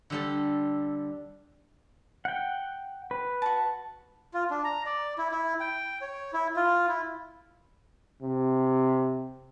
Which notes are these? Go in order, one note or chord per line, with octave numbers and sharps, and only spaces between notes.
D3 G3 A4
F#5 G5
B4
F#4 A5
F4
D4
A#5
D5
E4
E4
G5
C#5
E4
F4
E4
C3